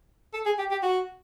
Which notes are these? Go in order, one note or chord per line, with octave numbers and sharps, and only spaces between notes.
A4
G#4
G4
G4
F#4